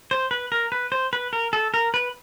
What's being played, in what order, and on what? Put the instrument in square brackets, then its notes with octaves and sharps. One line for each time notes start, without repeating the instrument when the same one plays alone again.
[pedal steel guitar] C5
B4
A#4
B4
C5
B4
A#4
A4
A#4
B4